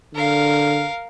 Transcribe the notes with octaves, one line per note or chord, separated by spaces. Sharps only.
D3 A#4 F5